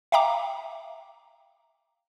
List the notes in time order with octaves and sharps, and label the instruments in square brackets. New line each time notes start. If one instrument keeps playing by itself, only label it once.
[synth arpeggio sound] E5 F5 G5 A#5 D6